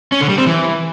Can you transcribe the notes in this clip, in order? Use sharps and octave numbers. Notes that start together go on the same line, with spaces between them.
C#4
D3
G3
C4
E3